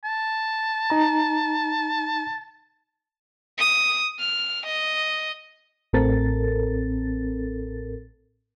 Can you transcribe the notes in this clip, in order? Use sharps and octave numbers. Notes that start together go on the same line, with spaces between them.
A5
D#4 A#5
D#6
F6
D#5
A1 A2 C4 A4 A#4 A6